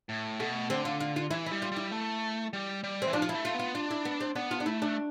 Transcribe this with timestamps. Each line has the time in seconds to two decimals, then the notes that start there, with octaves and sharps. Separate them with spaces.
0.09 A2
0.40 B2 A3
0.70 D3 C4
0.85 F4
1.00 F4
1.16 F4
1.31 E3 E4
1.46 E4
1.51 G3
1.62 F4
1.72 G3 E4
1.91 A3
2.53 G3
2.84 G3
3.02 E3 C4
3.13 F3 D4
3.22 F4
3.29 E4
3.34 A3
3.45 F4
3.54 B3
3.59 F4
3.75 D4 F4
3.91 E4
4.05 B3
4.21 C4
4.35 B3 D4
4.51 F4
4.60 D4
4.66 A3 E4
4.82 D4